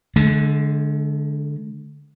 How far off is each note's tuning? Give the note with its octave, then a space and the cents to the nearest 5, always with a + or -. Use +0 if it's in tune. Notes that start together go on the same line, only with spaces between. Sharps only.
D3 +0 G#3 +40